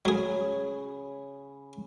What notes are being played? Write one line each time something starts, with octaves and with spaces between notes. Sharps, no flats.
C#3 F#3 G#4 B5